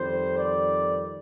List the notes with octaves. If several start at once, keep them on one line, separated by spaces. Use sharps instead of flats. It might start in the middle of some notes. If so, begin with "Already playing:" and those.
Already playing: F2 D#3 G3 C5
D5